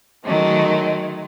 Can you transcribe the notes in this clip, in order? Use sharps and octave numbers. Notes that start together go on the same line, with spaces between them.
D#3 F#3 G#3 A3